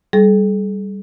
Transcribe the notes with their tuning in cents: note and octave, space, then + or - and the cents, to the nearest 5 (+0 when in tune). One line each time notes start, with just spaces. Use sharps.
G3 +0 G#4 +45